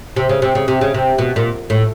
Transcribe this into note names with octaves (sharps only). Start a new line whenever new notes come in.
C3
C#3
C3
C#3
C3
C#3
C3
B2
A#2
A2